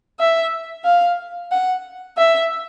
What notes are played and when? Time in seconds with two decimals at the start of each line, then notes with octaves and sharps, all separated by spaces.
0.19 E5
0.84 F5
1.52 F#5
2.18 E5